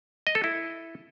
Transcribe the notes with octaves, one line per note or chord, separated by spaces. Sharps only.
D#5
A4
E4